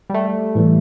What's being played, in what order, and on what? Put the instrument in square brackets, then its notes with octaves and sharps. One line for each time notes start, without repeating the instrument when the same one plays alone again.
[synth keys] G3
A3
[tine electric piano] A2 E3 G3